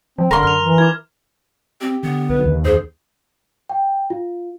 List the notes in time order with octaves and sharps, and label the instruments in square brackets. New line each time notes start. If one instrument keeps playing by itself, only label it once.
[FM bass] F3 [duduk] C4
[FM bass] D#1 [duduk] D3 [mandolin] A#4 C6
[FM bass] F#2 [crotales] F6 F7
[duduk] E3
[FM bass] E4 [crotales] D6 G#6
[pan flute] C4 [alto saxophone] G4
[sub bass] D3 [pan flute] B3
[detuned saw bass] B1 [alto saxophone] B4
[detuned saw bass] D#2
[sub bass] F2 [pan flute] G#4 [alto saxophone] C5
[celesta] G5
F4